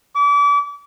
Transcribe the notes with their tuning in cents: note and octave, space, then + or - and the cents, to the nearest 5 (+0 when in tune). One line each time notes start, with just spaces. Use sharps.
D6 -35